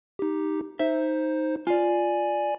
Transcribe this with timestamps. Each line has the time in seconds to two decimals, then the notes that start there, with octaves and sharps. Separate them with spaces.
0.19 D#4 G4
0.79 D#4 C5 E5
1.67 F4 D5 G#5